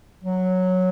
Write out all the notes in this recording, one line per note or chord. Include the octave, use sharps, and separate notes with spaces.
F#3